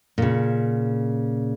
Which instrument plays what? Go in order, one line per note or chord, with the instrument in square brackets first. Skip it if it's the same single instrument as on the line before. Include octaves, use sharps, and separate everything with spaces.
[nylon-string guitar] A#2 C#3